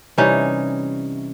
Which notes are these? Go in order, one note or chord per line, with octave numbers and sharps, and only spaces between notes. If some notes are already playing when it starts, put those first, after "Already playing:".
C3 E3 G3 C#4 D#4